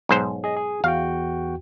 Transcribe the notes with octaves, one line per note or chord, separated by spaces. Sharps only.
B1 G#2 C5
G#4 D#5
G#4
E2 F#4 F5 G5